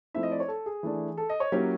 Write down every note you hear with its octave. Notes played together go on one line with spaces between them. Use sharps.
F3 A3 C4 E4 E5
D#5
D5
C#5
A4
G#4
E3 A3 D4
A4
D#5
C#5
F#3 A#3 C#4 E4 G4